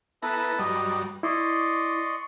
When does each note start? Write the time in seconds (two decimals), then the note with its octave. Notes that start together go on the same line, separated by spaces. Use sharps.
0.23 B3 E4 A4 B4 A5 A#5
0.59 G2 F#3 G3 D#5
1.23 E4 D5 D#5 C6 C#6